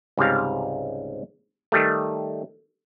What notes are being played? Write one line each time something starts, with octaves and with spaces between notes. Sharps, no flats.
C#2 G#2 C3 G3 F5
D#3 G3 A3